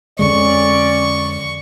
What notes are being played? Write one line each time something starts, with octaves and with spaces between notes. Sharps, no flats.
F2 D3 G#3 C#4 D5 C#6